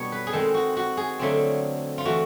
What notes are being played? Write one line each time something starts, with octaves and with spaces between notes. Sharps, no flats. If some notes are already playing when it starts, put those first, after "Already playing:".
Already playing: B2 G3 B3 D4 C#5
B4
G#4
D#3 G#3 C4 A4
F#4
F#4
G#4
D3 F#3 A3 C4 F4
F4
E3 A3 F#4